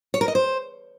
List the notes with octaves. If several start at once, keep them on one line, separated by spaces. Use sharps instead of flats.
C#5
A#4
D#5
C5